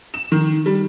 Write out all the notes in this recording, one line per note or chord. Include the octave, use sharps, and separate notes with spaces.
E7
D#3
G3